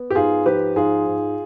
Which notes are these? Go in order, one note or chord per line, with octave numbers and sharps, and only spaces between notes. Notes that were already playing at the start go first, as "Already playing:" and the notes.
Already playing: B3
G4
G#2 F4 G#4
F3 G4 B4
G#2 F4 G#4
G#2